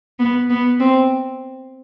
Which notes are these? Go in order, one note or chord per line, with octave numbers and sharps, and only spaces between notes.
B3
B3
C4